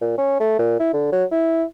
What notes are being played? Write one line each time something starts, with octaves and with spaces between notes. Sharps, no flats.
A#2
C#4
A3
A#2
E4
D3
F#3
E4